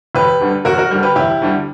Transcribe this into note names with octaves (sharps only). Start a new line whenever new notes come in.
E1 G4 B4
D2 D3 G3
E1 F#4 A#4
F#4 A#4
D2 D3 G3
G4 B4
E1 E4 G4
D2 D3 G3